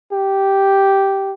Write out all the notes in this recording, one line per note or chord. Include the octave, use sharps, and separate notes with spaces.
G4